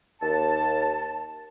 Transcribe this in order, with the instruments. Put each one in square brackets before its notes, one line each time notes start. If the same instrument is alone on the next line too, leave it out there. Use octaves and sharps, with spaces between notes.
[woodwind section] D#2 A5